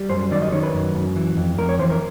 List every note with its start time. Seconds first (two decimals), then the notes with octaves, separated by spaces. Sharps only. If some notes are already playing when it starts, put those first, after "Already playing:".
Already playing: G3
0.09 F#2 C5
0.31 D#3 D5
0.42 D#5
0.52 D#3 C#5
0.63 B4
0.74 F#2
0.94 F#2
1.16 E3
1.37 F2
1.58 F2 A#4
1.69 C#5
1.79 E3 C5
1.90 A#4